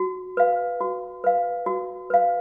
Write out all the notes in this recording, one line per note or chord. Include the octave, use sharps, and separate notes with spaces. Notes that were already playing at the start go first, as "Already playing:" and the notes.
Already playing: F#4
B4 F5
F#4
B4 F5
F#4
B4 F5